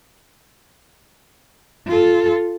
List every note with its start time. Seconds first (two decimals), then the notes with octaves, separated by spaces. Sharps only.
1.88 F4 A4